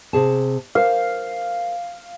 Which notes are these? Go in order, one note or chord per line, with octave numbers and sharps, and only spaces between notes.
C3 G#4 A5
A#4 C5 F5